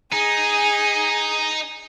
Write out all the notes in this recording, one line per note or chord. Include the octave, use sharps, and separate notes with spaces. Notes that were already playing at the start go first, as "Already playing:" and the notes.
D#4 G#4